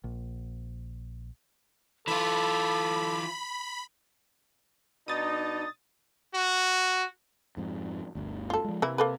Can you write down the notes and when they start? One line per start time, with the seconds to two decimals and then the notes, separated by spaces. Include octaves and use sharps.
0.04 A#1
2.08 E3 F4 A4 B5 D6
5.08 B2 D4 D#4 D#6 A6
6.34 F#4
7.57 F2 G#2
8.15 G1 D2
8.50 F4 A4
8.64 F3 G#3
8.82 C3 E3 A#3 E4
8.98 A#3 A4 B4